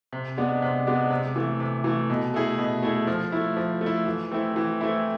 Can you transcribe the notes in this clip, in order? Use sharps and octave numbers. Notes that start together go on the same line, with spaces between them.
C3
G#3 B3 D4
C3
G#3 B3 D4
C3
E3 A3
C3
E3 A3
B2
A3 E4 G#4
B2
A3 E4 G#4
F3
A3 E4
F3
A3
E4
E3
A3 C4 E4
E3
A3 C4 E4